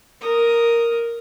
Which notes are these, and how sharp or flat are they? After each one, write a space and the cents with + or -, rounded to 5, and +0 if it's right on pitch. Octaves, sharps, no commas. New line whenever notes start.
A#4 +0 D#6 +0